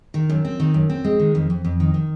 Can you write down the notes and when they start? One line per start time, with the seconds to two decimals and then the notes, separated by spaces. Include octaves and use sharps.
0.14 D#3
0.30 F#2
0.45 C4
0.60 D#3
0.74 F#2
0.90 C4
1.04 G#3
1.19 D#3
1.35 F2
1.50 F2
1.65 F2
1.80 D#3
1.94 D#3